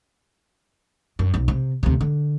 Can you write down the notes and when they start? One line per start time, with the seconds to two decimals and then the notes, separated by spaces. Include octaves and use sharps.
1.19 F#2
1.34 B1
1.48 C3
1.83 D2 C3
2.01 D3